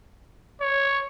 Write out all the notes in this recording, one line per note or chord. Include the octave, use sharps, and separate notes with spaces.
C#5